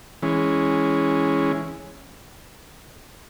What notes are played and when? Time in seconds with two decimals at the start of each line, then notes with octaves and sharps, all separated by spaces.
0.22 E3 G#3 C#4